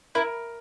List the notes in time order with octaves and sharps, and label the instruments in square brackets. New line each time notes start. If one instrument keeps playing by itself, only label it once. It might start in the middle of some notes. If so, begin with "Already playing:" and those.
[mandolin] E4 [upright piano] A#4